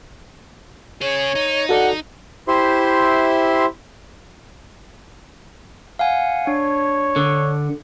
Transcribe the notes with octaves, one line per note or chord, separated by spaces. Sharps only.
C#4 G#4 C#5
D#4
F#4 A4 D5 F#5
E4 G4 C5 E5 C6
F5 F#5 G#5
D4 C#5
D3